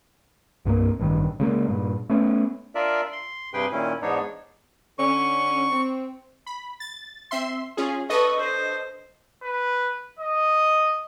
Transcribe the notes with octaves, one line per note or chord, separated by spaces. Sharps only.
C2 G2 E3 A#3
A1 G2 D#3
C#3 G#3 A#3
G2 A#2
A3 B3 C#4
D4 F4 A#4 D5 E5
C6
G2 C3 G#4 B4 G5 C6
A#2 D#3 C#4 E4
E2 G#2 B3 D4 D#4 C#5
D3 C#4 C#6
C4
B5
A6
C4 E5 C6
C#4 F4 G#4
D4 A4 B4 D#5 C#6
C5
B4
D#5